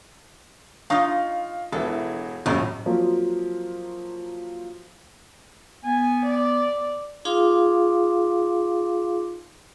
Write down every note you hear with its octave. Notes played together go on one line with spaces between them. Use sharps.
D#4 F4 F5 C#6 A#6
E1 E3 A4
D#1 G#1 F#2 A2
F3 F#3 A#3 C4
B3 G#5
D5
D#4 F4 G#4 F5 C6 D6